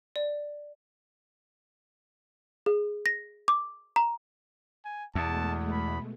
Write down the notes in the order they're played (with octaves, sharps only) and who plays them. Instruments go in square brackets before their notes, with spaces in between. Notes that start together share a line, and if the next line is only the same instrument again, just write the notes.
[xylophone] D5
G#4
A#6
D6
A#5
[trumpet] G#5
[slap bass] E2 [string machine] B2 G#3 A3 [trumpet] A5
[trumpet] B5